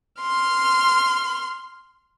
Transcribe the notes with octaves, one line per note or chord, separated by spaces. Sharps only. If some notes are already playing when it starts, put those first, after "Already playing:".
C6 F6